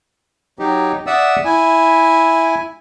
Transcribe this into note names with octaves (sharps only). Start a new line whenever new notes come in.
F#3 D#4 G4
D5 E5 F#5 D#6 E6
E4 G#5